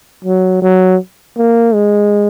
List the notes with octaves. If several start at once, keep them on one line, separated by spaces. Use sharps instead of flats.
F#3
F#3
A#3
G#3